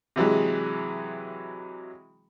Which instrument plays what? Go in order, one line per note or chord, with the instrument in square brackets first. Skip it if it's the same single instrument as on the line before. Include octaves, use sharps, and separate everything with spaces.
[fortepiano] C3 E3 F#3 G#3